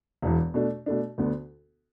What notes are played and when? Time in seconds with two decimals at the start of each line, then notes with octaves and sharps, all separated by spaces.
0.22 E1 E2 E3
0.54 B2 A3 D4
0.86 B2 A3 D4
1.18 D2 D3 B3 D4